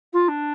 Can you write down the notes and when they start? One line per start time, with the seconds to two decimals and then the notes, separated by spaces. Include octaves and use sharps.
0.13 F4
0.28 D4